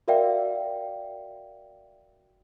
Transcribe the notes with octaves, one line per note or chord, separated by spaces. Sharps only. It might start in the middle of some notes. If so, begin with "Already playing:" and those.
F#4 A#4 D5 E5 F5 G5